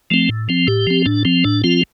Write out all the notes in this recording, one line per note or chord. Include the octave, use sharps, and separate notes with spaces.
F3 A3 C4
A2
F3 C4
A2 G4
F3 C4
A2 D4
F3 C4
A2 D4
F3 C4 F4